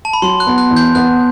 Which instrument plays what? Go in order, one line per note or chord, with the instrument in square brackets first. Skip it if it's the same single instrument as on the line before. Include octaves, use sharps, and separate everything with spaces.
[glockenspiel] A5
B5
[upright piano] F#3 [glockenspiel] C6
[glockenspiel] F#6
[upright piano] B3
[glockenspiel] F#6
[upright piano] E2
[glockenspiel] G6
[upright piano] B3 [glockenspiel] F#6